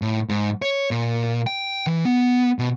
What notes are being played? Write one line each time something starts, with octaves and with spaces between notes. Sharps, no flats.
A2
G#2
C#5
A#2
G5
E3
B3
B2